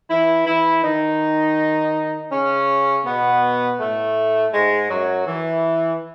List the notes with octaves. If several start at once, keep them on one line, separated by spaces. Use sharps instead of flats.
E3 E4
E3 E4
D#3 D#4
C#3 C#4
B2 B3
A2 A3
G#2 G#3
F#2 F#3
E3